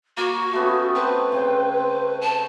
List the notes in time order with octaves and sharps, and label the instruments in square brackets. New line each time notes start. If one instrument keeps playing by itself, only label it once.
[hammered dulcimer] A#3 [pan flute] F#4
[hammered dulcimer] A3 B3 C#4
[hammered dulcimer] C4 C5 [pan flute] B4
[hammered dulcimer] C#3 C4 G5
[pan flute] A5